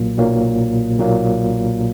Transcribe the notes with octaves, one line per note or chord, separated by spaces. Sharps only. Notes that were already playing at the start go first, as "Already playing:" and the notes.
Already playing: B1 A#2 F#3 A#3
B1 A#2 F#3 A#3
B1 A#2 F#3 A#3